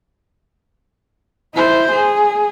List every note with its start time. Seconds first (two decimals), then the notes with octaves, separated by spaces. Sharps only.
1.55 E4 C5
1.92 G#4